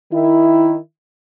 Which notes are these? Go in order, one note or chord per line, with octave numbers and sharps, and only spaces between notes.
D#3 E4